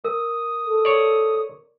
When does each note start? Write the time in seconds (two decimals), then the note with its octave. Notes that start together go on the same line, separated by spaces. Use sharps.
0.05 A#4 D#6
0.66 A4
0.85 C#5 D5